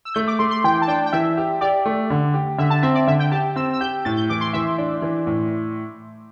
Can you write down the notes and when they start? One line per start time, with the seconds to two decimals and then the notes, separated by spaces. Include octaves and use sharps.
0.05 E6
0.15 A3 G6
0.28 D6
0.39 A3 C6
0.51 C6
0.64 E3 G5
0.82 A5
0.88 D4 G5
1.06 G5
1.13 E3 E5
1.37 G4
1.61 G4 D5
1.86 A3
2.10 D3
2.34 G4
2.58 D3 E5
2.70 A5
2.83 C4 E5
2.95 D5
3.08 D3 E5
3.20 G5
3.31 G4 A5
3.56 C4 E6
3.73 E6
3.81 G4 G6
4.05 A2 A6
4.17 G6
4.30 E3 D6
4.41 C6
4.53 E3 E5
4.78 D4
5.02 E3
5.27 A2